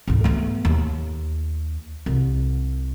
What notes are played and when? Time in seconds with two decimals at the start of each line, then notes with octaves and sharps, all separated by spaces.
0.08 D2 G#2
0.24 A3 B3
0.65 D#2
2.06 C2